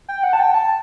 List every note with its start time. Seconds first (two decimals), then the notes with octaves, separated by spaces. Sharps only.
0.09 G5
0.24 F#5
0.33 A5
0.39 G5
0.54 A5